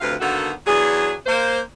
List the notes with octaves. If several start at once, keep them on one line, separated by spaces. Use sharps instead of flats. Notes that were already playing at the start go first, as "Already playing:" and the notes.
D2 C3 F3 B4 F5
D3 D#3 A#3 B3 F#4 A4
E2 F#3 D4 G#4
A#3 C5